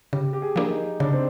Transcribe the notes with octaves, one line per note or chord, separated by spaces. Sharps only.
C#3 G4
G4
G#4
F3 A#3 D4
D#4
C#3 D4
C4